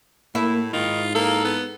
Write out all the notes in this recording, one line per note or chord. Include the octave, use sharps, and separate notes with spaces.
A2 A#3 E4
G#2 D#3 F4
A#3 A4
B3